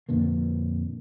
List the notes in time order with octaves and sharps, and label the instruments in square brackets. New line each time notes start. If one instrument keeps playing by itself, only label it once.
[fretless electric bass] F2 A#2 D3 A#3